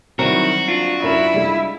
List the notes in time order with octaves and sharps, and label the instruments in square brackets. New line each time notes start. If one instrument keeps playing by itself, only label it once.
[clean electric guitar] D#3 E4 A#4 [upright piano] F#3 G3 C4 [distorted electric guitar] F#4
[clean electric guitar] D4 F4
[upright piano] F#2 A#4 E7 [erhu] E4
[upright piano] G3 G#3